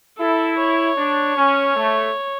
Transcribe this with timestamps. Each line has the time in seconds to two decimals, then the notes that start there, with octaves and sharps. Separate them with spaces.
0.18 E4 A4
0.58 C#5
0.97 D4
1.37 C#4
1.75 A3